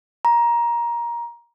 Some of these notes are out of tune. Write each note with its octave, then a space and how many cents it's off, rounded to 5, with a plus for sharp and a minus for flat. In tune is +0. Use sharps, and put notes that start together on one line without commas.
A#5 +15